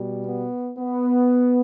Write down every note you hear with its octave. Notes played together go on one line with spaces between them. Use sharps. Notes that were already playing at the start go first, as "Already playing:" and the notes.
Already playing: B2 G3
B3
B3